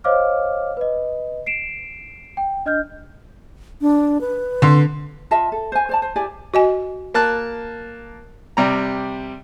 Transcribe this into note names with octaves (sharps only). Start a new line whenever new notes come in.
C5 C#5 D#5 F5 D6 F6
B4 D#5
C7 D7 E7
G5
D4 D#5 F6 G6
D4
B4
D3 C6
F4 D#5 E5 A5
A4
C5 G#5
C5 D5 A5
C5
E4 G4 D5 G#5
F#4 D#5 G#5
A#3 A5 F#6
C3 G3 A#5